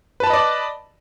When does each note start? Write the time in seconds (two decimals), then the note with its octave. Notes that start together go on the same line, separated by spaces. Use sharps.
0.20 B4
0.24 A5
0.27 B5
0.30 D#5
0.33 D5